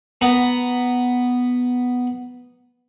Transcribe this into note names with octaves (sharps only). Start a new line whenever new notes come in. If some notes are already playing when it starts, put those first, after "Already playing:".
B3 A#5